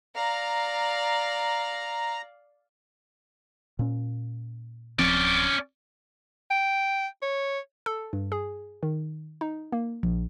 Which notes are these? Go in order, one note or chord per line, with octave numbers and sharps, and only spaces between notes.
D5 F5 A#5
A#2 C#4
D1 F3 C4 C#4 D5
G5
C#5
A4
G2
G#4
D#3
D#4
A#3
A#1